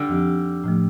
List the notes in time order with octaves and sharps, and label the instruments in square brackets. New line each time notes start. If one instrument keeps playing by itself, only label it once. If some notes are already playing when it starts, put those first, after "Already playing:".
Already playing: [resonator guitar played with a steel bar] D3 G3
[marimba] F2 F3 C4 G4
A2 F3 A3